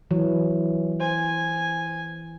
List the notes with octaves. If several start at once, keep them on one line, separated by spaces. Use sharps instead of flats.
E3 F#3
C5 G#5